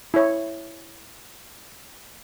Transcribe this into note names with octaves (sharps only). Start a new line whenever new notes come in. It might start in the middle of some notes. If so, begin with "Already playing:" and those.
E4 C#5